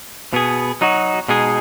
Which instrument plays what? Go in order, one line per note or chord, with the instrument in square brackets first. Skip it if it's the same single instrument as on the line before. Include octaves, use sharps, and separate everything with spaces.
[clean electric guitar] B2 B3 G#4
F#3 D#4 F#4
B2 G#3 D#4 G#4